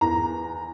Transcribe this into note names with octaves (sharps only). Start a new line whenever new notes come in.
E2 A#5